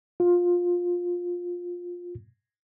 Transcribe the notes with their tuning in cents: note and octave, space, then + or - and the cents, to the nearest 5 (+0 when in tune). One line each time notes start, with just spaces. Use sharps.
F4 +15